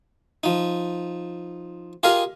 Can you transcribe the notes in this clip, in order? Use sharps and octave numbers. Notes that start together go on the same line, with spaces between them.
F3 D#4
F4 G4 G#4 A#4 D#5 F5